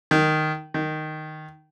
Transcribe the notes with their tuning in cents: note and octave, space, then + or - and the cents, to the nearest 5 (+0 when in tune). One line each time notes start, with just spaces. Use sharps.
D#3 -5
D#3 -5